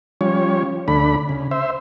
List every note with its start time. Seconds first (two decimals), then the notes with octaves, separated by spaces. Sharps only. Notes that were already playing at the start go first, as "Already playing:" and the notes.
0.21 F3 G3 C#4 C#5
0.88 D2 A3 D4 B5
1.29 C#3
1.51 C5 E5